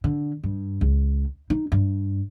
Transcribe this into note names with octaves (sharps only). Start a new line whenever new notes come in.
D3
G2
C#2
D#4
G2